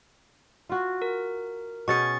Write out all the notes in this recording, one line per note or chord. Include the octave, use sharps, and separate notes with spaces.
F4 F#4
A#4
B2 C#4 G#4 C#6 A6 C#7